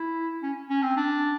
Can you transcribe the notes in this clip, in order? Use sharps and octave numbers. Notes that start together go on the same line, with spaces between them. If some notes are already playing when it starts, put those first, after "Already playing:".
Already playing: E4
C#4
C#4
C4
D4